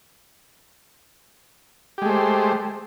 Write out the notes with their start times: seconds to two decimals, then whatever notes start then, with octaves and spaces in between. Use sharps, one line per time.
1.98 G4
2.02 G#3
2.06 A3
2.09 C5